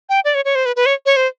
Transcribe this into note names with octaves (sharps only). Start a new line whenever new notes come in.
G5
D5
C#5
C#5
C5
B4
B4
C#5
C#5
C5